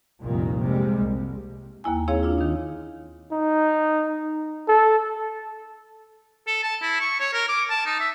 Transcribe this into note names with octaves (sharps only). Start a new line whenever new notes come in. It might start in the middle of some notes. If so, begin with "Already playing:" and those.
F1 C2 A#2 D#3 A#3
C3 G3 G#3 A#3
C2
D#2 A#3 E4 G#5
C4 E4 G#4 C#5 F5
D4 E4 F4
D#3 D#4
D#4
A4
A4
A5
E4
C#6
C#5
A#4
D6
A5
D#4
E5